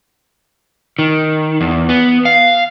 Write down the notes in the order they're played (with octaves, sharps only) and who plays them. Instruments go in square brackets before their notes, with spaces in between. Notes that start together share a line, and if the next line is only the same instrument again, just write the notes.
[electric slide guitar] D#3
E2
B3
F5